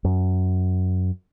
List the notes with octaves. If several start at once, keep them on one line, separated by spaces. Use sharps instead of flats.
F#2